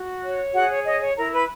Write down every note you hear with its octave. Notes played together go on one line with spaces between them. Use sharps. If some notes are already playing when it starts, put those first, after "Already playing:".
Already playing: F#4
C#5
F#4 G#4 F#5
C#5
C#5 D#5
C#5
E4 A#4 A#5
B4 B5